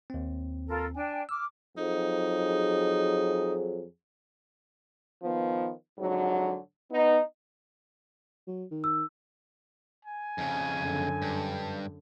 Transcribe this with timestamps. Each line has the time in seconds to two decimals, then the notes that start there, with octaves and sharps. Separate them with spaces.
0.10 D#2 C4
0.67 F4 A4 A#4
0.95 D4 G5 G#5
1.29 D6 E6 F6
1.77 F2 F#3 D#4 G#4
5.23 D#3 F3 B3
6.00 F2 G#2 D3 F#3
6.91 B3 D#4
8.47 F#3
8.71 D#3
8.84 E6
10.05 G#5
10.38 F2 C#3
10.80 F#2 D3
11.22 G2